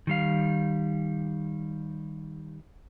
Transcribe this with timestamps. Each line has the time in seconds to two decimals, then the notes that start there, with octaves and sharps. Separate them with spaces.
0.07 D#3 G3 F5